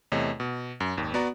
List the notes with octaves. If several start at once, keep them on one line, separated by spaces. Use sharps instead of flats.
E2 C3 A3 C#5 D#5
B2
F#2
G#1 D#2
B3 F#4 D5 A#5